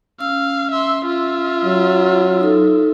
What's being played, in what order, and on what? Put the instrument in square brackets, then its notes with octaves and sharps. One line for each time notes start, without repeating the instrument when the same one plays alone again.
[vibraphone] C#4 E6 [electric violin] F5
[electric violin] E5 C6
F4 E5
[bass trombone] F#3
[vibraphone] D#4 A4